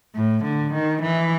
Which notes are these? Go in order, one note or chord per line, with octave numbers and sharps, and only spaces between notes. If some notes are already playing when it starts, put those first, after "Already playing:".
A2
D3
D#3
E3